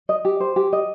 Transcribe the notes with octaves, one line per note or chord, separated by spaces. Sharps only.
D#5
G4
C5
G4
D#5